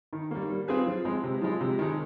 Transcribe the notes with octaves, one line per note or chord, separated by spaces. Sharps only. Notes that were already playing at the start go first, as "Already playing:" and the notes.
D#3
G3 A#3
G3
C4 F4 G#4 B4
F3
G#3 C4
C3
F3 G#3
C3
D#3 G#3